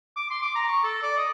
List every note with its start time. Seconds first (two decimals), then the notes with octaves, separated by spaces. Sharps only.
0.16 D6
0.30 C6
0.43 D6
0.55 A#5
0.69 C#6
0.84 A4
1.02 D5
1.17 D#5